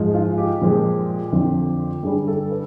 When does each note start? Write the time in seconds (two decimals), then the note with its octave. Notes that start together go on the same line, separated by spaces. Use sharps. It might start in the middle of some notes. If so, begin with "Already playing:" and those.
Already playing: G#2 F3 G#3
0.14 F4
0.38 G4
0.61 A#2 F3 G#3
1.32 F2 D3 F3
2.03 G2 D3 G3 G#4
2.28 A4
2.51 B4